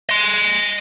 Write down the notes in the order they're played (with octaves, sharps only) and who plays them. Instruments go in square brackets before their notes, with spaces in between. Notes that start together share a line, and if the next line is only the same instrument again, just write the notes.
[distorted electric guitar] D#5 C6